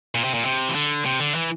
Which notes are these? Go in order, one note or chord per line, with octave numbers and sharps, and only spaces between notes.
A#2
C3
A#2
C3
E3
D3
C3
D3
E3